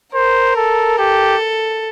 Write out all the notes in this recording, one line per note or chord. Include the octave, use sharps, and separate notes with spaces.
A#4 C5
A4
G4 A4